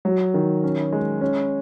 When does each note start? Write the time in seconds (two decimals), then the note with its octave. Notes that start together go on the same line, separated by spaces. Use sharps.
0.05 F#3
0.34 D#3
0.63 C#4
0.92 G#3
1.21 C#4